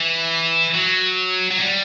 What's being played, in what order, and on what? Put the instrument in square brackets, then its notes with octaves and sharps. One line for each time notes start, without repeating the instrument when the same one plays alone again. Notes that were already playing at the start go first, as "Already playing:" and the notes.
Already playing: [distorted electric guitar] E3
F#3
F#3
G3